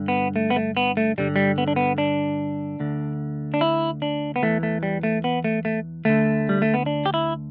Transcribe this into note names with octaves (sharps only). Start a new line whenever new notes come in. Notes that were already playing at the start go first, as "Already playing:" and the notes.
Already playing: G2 D3
B3
A3
B3
A3
B3
A3
G2 D3 G3
G3
B3
D4
B3
D4
D2 D3
D4
E4
D4
B3
E2 E3 A3
A3
G3
A3
B3
A3
A3
D2 D3 A3
G3
A3
B3
D4
G4
E4